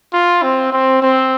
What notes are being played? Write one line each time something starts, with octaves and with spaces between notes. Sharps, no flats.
F4
C4
C4
C4